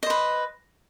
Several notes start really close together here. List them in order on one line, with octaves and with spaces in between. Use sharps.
D#5 C5 B4